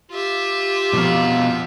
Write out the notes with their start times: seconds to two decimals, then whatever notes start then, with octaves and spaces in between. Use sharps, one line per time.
0.11 F4 G4 E5
0.93 B1 F2 B2 F5